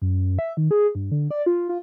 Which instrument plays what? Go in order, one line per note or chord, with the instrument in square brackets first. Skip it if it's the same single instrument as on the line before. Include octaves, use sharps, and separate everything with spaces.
[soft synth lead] F#2
E5
D#3
G#4
G2
D3
D5
F4
F4